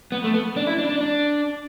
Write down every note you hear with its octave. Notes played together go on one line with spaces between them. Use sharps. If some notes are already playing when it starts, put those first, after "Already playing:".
B3
A3
B3
D4
E4
D4
D4
D4